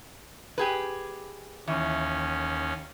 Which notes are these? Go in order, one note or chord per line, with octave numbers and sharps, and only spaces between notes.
G4 G#4 B4
D#2 E3 C#4